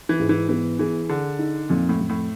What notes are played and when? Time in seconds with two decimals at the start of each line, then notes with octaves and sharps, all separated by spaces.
0.09 E3
0.19 G#2
0.29 E3
0.49 E3 B3
0.79 E3 G#4
1.09 D3 G#4
1.39 D#4
1.69 F2 A#2
1.89 A2
2.00 F2
2.09 A2